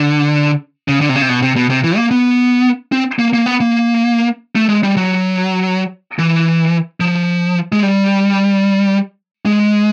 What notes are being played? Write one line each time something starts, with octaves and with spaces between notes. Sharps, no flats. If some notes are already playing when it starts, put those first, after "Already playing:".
Already playing: D3
C#3
D3
C3
C#3
C3
B2
C3
B2
C3
E3
A#3
B3
C4
A#3
A#3
B3
A#3
A3
G#3
G3
F#3
E3
F3
G#3
G3
G#3